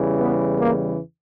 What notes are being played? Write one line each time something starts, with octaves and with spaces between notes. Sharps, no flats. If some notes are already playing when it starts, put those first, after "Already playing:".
Already playing: E2 C#3 E3 G3
B3
A#3